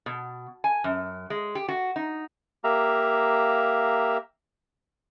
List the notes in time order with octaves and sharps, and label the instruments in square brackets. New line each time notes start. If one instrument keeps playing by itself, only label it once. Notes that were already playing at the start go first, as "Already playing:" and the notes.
[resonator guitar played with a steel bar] B2
G#5
F#2
G#3
G4
F#4
D#4
[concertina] A#3 G4 E5 F5 A#5